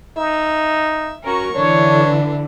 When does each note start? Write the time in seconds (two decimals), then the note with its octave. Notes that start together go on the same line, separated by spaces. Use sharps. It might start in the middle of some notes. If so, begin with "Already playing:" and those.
0.17 D#4 E5
1.24 C#4 F#4 A#4 C#6
1.55 D3 E3 D4 C#5